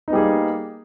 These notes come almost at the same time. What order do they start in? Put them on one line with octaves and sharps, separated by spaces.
D#4 B3 G3 G#4 A#3